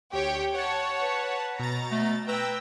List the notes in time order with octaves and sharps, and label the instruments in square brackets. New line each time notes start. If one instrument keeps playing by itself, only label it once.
[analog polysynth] D2 [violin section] G4 C#5 G5
[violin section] C#5 [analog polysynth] F#5 A5
[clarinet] B4
[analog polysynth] B2 A6 [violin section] A#5
[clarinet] A3
[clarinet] B4 [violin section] G5 [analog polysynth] A#5 E6 A#6